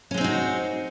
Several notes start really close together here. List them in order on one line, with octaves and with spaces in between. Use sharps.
C#4 G#3 C4 D#4 F#4